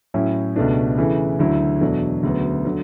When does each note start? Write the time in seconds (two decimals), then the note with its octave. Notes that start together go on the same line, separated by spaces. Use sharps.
0.14 A2 F#3 C#4 E4
0.56 C#2 B2 A3 D4
0.98 C#3 E3 A3 E4
1.39 D2 D3 F#3 A3 E4
1.81 E2 B2 F#3 A3 D4
2.23 D2 C#3 F#3 B3
2.65 D3 F#3